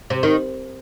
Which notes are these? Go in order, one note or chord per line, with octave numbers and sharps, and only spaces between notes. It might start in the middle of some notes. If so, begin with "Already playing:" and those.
C3
D#3